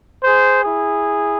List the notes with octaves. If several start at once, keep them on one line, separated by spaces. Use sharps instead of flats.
G#4 C5
E4 G#4